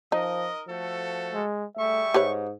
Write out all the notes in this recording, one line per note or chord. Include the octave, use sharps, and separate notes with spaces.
F3 D#4 A#4 D#5
F3 A3 F#4 A4
G#3
G3 A3 G#4 E5 C#6
G#2 G4 B4 C#5